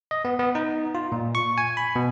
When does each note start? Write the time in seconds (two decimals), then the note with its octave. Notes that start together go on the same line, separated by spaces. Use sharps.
0.11 D#5
0.25 B3
0.39 B3
0.55 D#4
0.95 F4
1.12 A#2
1.35 C#6
1.58 G#5
1.77 B5
1.96 B2